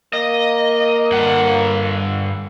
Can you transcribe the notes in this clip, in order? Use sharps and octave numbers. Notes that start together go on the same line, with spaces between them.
A#3 D#5
G2 F#5